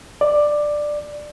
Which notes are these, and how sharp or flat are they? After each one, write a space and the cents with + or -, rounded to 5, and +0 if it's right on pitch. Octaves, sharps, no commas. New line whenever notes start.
D5 +10